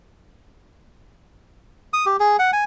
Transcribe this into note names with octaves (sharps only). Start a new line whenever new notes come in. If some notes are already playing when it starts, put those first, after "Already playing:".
D#6
G4
G#4
F#5
G#5